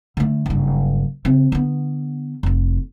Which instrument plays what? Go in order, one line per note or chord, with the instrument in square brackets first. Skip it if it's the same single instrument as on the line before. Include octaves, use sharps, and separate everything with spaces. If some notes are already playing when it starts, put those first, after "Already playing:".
[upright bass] D3 A3
F#1 G2
C#3 C4
D3 B3
F1 F4